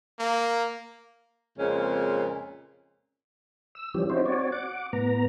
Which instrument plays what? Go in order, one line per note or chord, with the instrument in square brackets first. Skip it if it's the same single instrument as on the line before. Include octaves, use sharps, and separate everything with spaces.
[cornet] A#3
[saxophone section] F2 A#2 C#3 G#3 C4 C#4
[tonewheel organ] E6
E3 F3 G3 C#4 G4
C4 C#4 D#4 E4 F#4 C5
C4 F#4 C#5 D5
F#5 D6
A2 B3 A#5